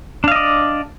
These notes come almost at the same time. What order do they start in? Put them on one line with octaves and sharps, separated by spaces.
D4 F5 D#5 D5